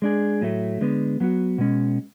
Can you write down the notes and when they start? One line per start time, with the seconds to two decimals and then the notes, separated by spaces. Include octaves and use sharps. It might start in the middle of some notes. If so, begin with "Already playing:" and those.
0.02 G#3 D4 G#4
0.41 A2 F#3 A3
0.81 D3 G#3 B3
1.20 F#3 B3 F#4
1.58 B2 G#3 C#4